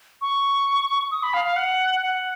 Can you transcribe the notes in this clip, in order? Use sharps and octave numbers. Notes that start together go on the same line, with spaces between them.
C#6
D#6
B5
F5
F5
F#5
F#5